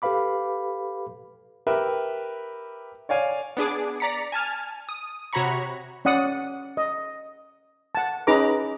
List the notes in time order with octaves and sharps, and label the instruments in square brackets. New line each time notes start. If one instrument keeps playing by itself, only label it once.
[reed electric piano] G4 A4 B4 F5 B5 D6
[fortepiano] G4 A#4 B4 E5
C#5 D5 F5 G#5
[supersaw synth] B3 D4 G#4 D6
D5 A#5 B6 C#7
G#5 A5 F6
D#6
C3 F#4 C#5 A#5 B5 C#6
[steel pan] C#4 D5 F#5 D#6
D#5
F#5 A5
C#4 D#4 G#4 B4 A#5 D6